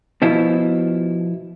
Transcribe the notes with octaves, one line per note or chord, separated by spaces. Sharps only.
B2 F3 E4